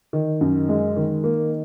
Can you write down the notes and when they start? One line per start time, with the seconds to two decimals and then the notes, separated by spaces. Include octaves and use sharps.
0.13 D#3
0.41 F#2
0.69 G#3
0.96 D#3
1.24 A#3